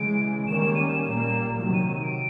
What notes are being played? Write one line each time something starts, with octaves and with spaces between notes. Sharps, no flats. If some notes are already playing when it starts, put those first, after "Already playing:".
Already playing: C#3 E3 G#3 D7
D#3 G3 A#3 C#4 E7
E7
D#7
E7
A#2 G3 A#3 E7
C3 D#3 F#3
D#7
D#7
D7